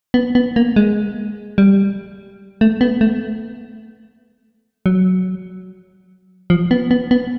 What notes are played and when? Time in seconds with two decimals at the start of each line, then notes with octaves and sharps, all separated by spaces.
0.14 B3
0.35 B3
0.56 A#3
0.76 G#3
1.58 G3
2.61 A3
2.81 B3
3.01 A3
4.86 F#3
6.50 F3
6.71 B3
6.91 B3
7.11 B3